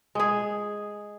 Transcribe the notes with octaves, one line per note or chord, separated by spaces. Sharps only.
G#3 G#4